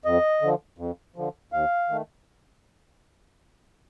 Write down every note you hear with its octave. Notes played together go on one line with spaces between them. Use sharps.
F2 D#5
D3 F3
F2
D3 F3
D#2 F5
D#3 A3